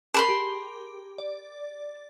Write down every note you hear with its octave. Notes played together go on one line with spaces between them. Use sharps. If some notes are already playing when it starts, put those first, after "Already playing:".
G#4 A#4 A5 B5 C6
G4
D5